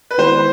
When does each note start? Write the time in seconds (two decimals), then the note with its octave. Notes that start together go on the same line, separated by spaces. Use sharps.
0.11 B4
0.18 D#3 G#3 B3 E4 G4 C5